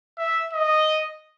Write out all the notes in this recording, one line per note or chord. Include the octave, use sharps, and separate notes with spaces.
E5
D#5